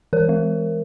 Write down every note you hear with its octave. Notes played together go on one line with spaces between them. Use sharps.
E3 A#4
G#3